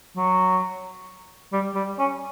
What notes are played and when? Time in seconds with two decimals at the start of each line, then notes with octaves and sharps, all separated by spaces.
0.16 F#3
1.53 G3
1.75 G3
1.99 C#4